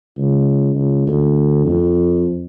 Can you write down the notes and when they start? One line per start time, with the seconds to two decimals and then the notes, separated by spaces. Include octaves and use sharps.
0.17 C#2
0.75 C#2
1.07 D2
1.65 F2